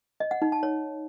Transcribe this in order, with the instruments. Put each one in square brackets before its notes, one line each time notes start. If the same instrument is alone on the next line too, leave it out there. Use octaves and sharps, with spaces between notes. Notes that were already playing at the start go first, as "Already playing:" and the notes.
[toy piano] D#5
F#5
D#4
A5
C#5